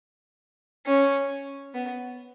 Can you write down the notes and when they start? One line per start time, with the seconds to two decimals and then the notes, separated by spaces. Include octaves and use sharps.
0.86 C#4
1.74 B3